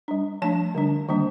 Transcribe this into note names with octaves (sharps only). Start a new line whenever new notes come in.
G3 D4
F3 A3 D4 A5
D3 G3 D4
D#3 G3 A#3 D4